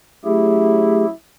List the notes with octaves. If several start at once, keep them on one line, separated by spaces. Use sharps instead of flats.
F#3 A3 C#4 E4 G4 G#4